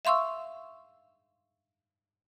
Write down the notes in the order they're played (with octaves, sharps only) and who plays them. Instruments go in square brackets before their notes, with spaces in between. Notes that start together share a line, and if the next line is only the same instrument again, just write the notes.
[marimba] E5 F5 C6 C#6 E6